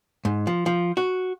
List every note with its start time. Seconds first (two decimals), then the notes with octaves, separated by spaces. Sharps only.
0.25 G#2
0.47 F3
0.66 F3
0.97 F#4